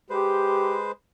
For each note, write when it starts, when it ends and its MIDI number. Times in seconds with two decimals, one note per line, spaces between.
0.10 0.92 56
0.10 0.79 67
0.10 0.92 71
0.10 0.92 72